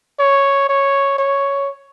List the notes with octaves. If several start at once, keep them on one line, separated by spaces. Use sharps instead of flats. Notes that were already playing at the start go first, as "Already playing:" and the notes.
C#5
C#5
C#5